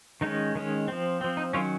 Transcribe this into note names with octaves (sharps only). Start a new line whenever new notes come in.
D#3 G#3 C#4 D#4
D#3 G#3 C#4
F3 C4
F3 C4
D#4
D#3 F#3 C#4 F4